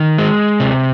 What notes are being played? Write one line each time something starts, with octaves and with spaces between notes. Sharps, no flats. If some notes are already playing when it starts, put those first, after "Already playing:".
Already playing: D#3
G#3
C3